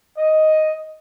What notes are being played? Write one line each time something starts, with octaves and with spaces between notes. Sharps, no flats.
D#5